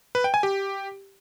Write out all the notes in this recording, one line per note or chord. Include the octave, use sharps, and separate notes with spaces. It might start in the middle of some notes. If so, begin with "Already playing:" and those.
B4
G5
G#5
G4